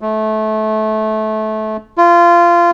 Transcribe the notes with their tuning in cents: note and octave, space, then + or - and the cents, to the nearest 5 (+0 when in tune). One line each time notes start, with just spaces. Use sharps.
A3 -25
F4 -20